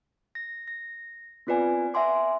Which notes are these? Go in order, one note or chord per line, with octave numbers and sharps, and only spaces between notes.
A#6
A#6
B3 C4 F4 B4 D5 G#5
E5 F#5 G#5 C6 D6